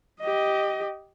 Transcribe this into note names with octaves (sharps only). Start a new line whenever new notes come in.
G4 D#5